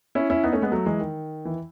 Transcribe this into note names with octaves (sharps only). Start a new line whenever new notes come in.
C#4 E4
C#4 E4
B3 D#4
A3 C#4
G#3 B3
F#3 A3
E3 G#3
D#3
E3